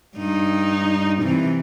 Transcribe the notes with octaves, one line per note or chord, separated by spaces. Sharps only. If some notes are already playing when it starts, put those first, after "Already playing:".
G2 D#4
C3 E3